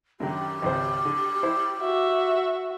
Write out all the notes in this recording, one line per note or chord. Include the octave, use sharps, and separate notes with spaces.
F#2 D3 D#3 G4
G#1 C#2 C5
D3
E4 C5
F#4 E5